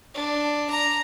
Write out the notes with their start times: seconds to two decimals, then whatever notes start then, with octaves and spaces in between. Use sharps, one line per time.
0.14 D4
0.70 A#5